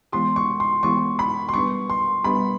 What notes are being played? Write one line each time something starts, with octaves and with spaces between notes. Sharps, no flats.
E3 G#3 B3 E4 G4 C6
C#6
C6
E3 G#3 B3 E4 G4 C#6
B5
C6
G3 B3 D4 G4 B4 C#6
C6
G3 B3 D4 G4 B4 B5